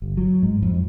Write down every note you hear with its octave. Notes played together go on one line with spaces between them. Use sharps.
G1
F#3
G#2
F2